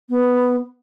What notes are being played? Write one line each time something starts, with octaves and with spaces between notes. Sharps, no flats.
B3